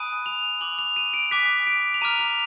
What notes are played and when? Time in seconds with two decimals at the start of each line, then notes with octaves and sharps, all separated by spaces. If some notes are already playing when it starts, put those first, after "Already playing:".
Already playing: G#5 B5 D#6 F#6 D#7
0.26 F7
0.61 G#5 D6 F#6 F#7
0.79 F7
0.96 D#7
1.14 D7
1.31 G#5 D6 F#6 B6
1.67 D7
1.94 F7
2.01 A#5 D6 F6 D#7
2.19 F7